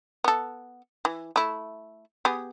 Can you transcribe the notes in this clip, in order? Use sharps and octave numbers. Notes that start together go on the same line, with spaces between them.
B3 A4
E3
A3 E4
B3 G4 G#4